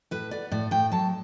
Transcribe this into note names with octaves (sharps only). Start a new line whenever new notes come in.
A2 B4
B3 D5
A2 D5
A2 G5
F#3 A5